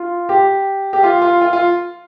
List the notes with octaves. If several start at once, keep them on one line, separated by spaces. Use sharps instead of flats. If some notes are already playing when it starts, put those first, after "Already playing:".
Already playing: F4
G4
G4
F4
F4
F4
F4